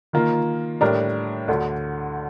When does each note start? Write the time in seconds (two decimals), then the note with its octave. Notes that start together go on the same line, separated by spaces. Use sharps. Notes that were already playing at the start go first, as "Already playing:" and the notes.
0.13 D#3 A#3 F4
0.81 A2 G3 D4 G4 A#4
1.48 D2 D3 A3